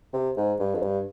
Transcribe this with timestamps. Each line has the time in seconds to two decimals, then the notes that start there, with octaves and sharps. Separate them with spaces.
0.13 C3
0.37 G#2
0.60 G2
0.74 F2
0.82 G2